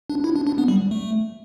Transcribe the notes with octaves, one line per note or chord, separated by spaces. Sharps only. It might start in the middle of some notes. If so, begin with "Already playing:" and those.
D4
E4
D4
D4
B3
G3
A3